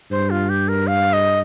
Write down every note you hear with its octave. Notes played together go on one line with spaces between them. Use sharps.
G2 C5
F4
G4
A#4
F5
D#5